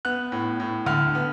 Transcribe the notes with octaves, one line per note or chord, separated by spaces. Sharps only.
B3 F#6
A2
A2
D3 F6
B3